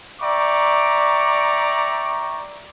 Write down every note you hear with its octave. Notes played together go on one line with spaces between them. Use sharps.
D5 E5 G5 A#5 C#6 D6